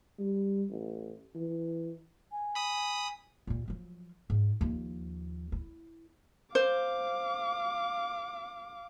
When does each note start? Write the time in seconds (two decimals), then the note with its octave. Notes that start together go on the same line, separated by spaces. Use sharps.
0.19 G3
0.70 A1
1.35 E3
2.32 G#5
2.55 B5 D#6
3.47 D#2 A#2
3.68 F3 F#3
4.30 G#2
4.61 D#2 F3
5.52 E4
6.55 C5 F5 D6